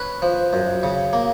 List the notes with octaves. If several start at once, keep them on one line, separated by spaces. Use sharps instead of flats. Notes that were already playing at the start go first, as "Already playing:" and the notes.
Already playing: C#4 B4
F3
F#2
C#3
A#3